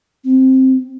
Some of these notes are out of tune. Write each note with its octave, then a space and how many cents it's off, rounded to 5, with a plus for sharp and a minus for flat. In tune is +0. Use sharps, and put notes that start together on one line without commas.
C4 +5